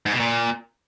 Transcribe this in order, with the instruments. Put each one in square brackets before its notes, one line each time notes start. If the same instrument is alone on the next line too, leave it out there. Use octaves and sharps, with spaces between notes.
[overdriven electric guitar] G#2
B2
A#2